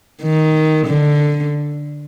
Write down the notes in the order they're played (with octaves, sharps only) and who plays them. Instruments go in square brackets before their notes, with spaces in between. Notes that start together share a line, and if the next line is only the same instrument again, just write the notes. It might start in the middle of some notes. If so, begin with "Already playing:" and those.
[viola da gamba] D#3
D3